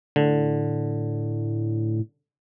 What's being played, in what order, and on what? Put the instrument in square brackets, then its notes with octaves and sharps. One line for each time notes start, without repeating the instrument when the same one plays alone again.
[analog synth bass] A2 [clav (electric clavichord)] D3